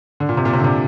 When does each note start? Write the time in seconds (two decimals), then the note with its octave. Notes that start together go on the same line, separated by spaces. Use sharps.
0.20 D3
0.29 A#2
0.37 C3
0.45 A#2
0.53 C3
0.60 D3
0.64 C3